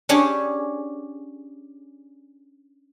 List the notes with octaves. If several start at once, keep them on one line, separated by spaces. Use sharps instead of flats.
C#4 D4 G4 G#4 C#5